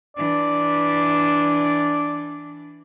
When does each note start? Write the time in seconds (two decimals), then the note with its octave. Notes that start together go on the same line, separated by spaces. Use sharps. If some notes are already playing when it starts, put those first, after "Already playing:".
0.17 E3 D4 D5